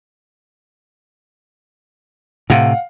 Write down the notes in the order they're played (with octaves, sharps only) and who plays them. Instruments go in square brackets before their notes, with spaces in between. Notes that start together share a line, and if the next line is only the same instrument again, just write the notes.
[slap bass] A2 C3 [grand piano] F5 F#5